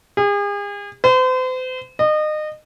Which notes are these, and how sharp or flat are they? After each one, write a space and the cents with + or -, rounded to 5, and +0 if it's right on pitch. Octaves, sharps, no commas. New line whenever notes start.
G#4 -40
C5 -40
D#5 -30